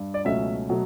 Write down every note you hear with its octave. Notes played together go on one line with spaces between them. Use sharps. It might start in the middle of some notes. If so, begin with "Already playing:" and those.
Already playing: G2
D5
C#2 B2 F#3 A3 C#4 E5
B2 F#3 A3